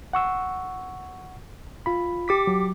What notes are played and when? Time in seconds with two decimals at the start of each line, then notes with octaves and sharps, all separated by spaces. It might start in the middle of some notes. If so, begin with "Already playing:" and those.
0.13 F#5 C#6 E6
1.86 F4 B5
2.28 G4 D6 B6
2.47 F#3